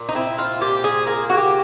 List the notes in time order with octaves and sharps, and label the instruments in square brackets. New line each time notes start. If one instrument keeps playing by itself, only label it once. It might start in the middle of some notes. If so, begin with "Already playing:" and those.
Already playing: [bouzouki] A#2
D#4
C4 E4
F4
A#2 G4
G#4
A#3 G#4
F#4
G4